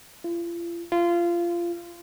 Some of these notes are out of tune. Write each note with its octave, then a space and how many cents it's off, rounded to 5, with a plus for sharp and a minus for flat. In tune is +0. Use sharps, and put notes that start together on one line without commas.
F4 -40
F4 -20